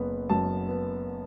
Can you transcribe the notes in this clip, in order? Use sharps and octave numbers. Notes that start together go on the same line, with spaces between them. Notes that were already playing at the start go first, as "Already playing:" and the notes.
Already playing: F#1 B3
F#2 A5
B3